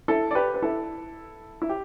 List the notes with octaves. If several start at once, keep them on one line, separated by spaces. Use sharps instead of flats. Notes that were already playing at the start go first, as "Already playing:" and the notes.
E4 A4
D5
G4 B4
B4
E4 A4
E4
G4